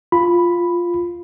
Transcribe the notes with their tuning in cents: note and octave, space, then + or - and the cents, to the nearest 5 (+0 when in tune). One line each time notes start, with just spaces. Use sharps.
F4 +0 B5 +0